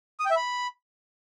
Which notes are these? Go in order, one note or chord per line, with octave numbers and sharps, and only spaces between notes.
D#6
G5
E5
B5